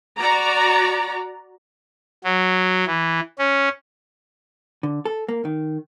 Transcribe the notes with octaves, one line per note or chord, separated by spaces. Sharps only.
F#4 D5 A#5
F#3
E3
C#4
D3
A4
A#3
D#3